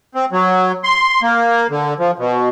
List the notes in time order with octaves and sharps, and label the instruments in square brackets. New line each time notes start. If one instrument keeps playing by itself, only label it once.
[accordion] C4
F#3
C6
A#3
D3
F3
B2